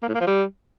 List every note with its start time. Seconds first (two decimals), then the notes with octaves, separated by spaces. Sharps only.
0.02 A#3
0.08 A2
0.14 A#3
0.21 F3
0.27 G3